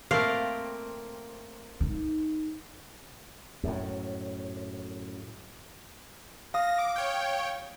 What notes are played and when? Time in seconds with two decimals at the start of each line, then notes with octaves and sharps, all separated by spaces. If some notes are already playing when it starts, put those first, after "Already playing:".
0.11 A3 A#3 C4 F5
1.80 D#4
3.64 F#2 A2
6.54 F5 D#6 A#6
6.78 D6
6.96 C#5 G5